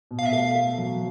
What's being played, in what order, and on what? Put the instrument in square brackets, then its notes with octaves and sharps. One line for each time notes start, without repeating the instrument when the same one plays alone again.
[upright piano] B2
[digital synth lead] F5
E5
[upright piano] A3 [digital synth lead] F5
[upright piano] A3
F#3